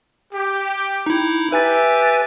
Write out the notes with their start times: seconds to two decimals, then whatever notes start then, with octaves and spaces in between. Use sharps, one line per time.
0.33 G4
1.06 D#4 E4
1.52 G4 B4 E5 G#5 A6